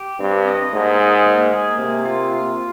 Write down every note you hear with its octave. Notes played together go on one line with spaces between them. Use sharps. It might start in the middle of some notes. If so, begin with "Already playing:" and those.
Already playing: G4
G2 C4
D#5
G#2 A#3
G#4
A#3
G#4
C3 A#3
F4
F4